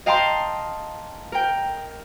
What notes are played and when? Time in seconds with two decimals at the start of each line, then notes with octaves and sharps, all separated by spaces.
0.06 D#5 F5 G5 A5 A#5 C6
1.32 A#4 G5